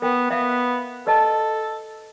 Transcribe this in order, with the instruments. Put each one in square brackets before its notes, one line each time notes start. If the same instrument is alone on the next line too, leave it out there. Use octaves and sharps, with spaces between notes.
[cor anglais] B3 [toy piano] A#4 G5
[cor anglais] B3 [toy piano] E5 F5
[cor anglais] A4 [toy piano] B4 D#5 A5